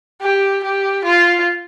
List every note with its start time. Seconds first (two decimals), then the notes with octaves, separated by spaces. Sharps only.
0.22 G4
0.64 G4
1.05 F4